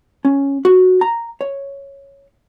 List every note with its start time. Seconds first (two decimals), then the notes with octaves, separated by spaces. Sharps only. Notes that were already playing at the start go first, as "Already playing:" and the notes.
0.25 C#4
0.65 F#4
1.01 A#5
1.41 C#5